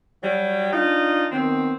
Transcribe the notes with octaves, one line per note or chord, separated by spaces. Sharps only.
F#3 G3
D4 D#4 F4
D#3 F#3 B3 C4